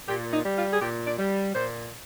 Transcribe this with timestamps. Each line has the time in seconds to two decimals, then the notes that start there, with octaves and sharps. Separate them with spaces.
0.08 A#2 G4
0.33 D#4
0.45 G3
0.57 F4
0.73 G#4
0.81 A#2 G4
1.06 D5
1.19 G3
1.55 A#2 C5